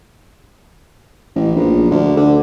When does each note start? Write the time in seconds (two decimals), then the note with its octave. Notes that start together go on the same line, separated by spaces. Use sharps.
1.35 A1
1.56 A#1
1.90 D2
2.17 D3